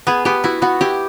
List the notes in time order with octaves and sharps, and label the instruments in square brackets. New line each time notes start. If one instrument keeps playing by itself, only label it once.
[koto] B3 [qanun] G#4
[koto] B3 [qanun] G4
[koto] E4 [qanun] F#4
[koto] B3 [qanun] F#4
[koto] E4 [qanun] G4